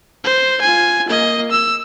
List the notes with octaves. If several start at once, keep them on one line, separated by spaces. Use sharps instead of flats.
C5
F4 G#5
A#3 D#5
E6